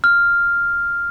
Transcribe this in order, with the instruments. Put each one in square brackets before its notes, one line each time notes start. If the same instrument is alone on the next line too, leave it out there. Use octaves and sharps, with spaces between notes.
[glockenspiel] F6